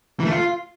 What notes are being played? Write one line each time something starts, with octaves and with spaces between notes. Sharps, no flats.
E3
A3
F4